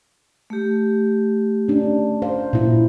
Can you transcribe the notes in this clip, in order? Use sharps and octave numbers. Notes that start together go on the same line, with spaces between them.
A3 G4
C#4 D4
C5 F5
A#2 E4